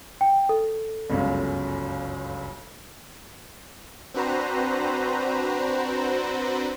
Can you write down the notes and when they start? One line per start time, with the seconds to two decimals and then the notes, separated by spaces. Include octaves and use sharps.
0.21 G5
0.49 A4
1.10 G1 C#2 F#2
4.14 C4 D4 F#4 B4 C5 A#5